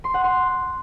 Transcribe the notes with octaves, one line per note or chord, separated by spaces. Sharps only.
C6
F#5
C6